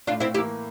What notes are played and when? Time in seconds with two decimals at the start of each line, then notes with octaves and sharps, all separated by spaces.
0.07 A2 D4 F4
0.20 C4 E4
0.34 E3 A#3 E4 G4